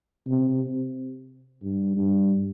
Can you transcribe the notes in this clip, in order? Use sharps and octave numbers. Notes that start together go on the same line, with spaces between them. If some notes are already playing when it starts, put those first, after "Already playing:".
C3
G2
G2